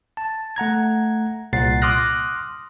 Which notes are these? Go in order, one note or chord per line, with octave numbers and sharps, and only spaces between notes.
A5
A3 F#5 A#5 G#6
C2 A#2 F#5 A6 C7
C6 D6 D#6 F6 F#6 A#6